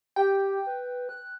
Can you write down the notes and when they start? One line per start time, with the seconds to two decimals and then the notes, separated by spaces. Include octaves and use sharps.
0.16 G4 G5
0.66 B4
1.09 F#6